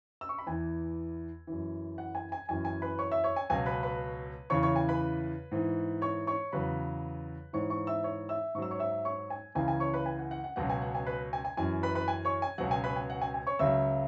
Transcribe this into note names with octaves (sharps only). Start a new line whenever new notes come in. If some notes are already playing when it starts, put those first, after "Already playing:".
E6
C#6
B5
E2 E3 G#5
F#2 E3
F#5
G#5
G#5
F#2 E3 G#5
G#5
B4 B5
C#5 C#6
E5 E6
C#5 C#6
G#5
C#2 B2 F#3 G#5
B4 B5
B4 B5
E2 C#3 E3 C#5 C#6
C#5 C#6
G#5
B4 B5
G#2 E3
C#5 C#6
C#5 C#6
E2 C#3 F#3 B4 B5
G#2 E3 C#5 C#6
C#5 C#6
E5 E6
C#5 C#6
E5 E6
G#2 F#3 C#6 E6
C#5 C#6
E5 E6
C#5 C#6
G#5
C#2 C#3 E3 G#5
G#5
C#5 C#6
B4 B5
G#5
F#5
F#5
F#5
C#2 B2 F#3 F#5
G#5
F#5
G#5
B4 B5
G#5
G#5
F#2 E3 G#5
B4 B5
B4 B5
G#5
C#5 C#6
G#5
C#2 B2 F#3 F#5
G#5
B4 B5
G#5
F#5
G#5
G#5
C#5 C#6
C#2 C#3 F#3 E5 E6